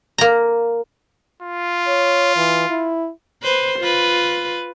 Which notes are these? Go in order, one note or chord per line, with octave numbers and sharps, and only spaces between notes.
A#3 A#5
F4
C#5
E3
E4
B4 C5
F4 B4